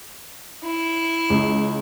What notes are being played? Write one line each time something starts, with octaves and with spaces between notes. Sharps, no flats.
E4
C#2